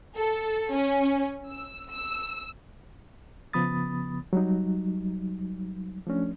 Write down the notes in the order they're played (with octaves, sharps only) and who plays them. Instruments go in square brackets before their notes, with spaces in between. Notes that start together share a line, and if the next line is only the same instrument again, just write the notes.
[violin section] A4
C#4
E6
E6
[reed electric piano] C#3 F3 B3 B5 D#6 A6
F#3 G3 D#4
F3 A3 C#4 D4